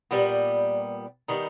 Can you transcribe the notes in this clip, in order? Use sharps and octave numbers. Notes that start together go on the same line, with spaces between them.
A#2 G3 B3
D#3 G3 B3 D#4